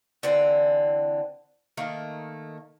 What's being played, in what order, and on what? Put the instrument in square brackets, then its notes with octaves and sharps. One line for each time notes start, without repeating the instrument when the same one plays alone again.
[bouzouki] D3 E3 C4
D#3 A3 A#3